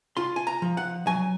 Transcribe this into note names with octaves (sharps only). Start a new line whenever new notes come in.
F4 C6
G#5
A#5
F3
F#5
F#3 G#5